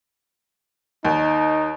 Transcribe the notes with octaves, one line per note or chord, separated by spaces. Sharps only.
D#2 D#4